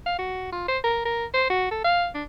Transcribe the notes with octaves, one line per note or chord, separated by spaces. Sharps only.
F5
F#4
F4
C5
A#4
A#4
C5
F#4
A4
F5
D4